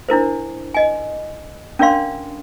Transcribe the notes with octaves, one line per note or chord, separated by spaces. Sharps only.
D4 E4 A#4 C5
D#5 G#5
C#4 D4 A#4 D5 F5 C6